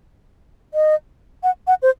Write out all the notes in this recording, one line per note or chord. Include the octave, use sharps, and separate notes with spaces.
D#5
F#5
F#5
C5